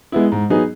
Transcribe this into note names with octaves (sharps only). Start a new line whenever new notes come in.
G#3 B3 E4
G#2
F#3 B3 D#4 G#4